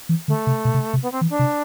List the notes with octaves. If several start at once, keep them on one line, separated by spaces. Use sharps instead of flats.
E3
D3 A3
C3
B2
C3
C3
B3
C4
E3
D4
C3